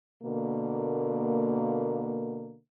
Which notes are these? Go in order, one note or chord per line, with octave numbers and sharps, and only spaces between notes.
B2 D3 A#3